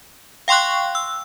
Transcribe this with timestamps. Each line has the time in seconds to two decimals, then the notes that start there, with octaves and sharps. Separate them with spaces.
0.48 F5 G5 C6 C#6 F#6
0.95 E6